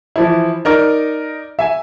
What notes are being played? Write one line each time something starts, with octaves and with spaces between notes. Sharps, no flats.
E3 F3 E4
D#4 A#4 D5
E5 G#5